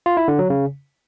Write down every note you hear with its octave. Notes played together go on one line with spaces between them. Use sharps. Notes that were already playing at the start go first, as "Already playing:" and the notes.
F4
E4
D3
F#3
C#3